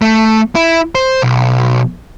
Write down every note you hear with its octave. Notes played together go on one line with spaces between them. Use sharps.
A3
E4
C5
B1